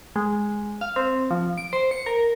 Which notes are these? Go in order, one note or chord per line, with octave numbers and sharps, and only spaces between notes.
G#3
F5
C4
F3
D7
C5
C#7
A#4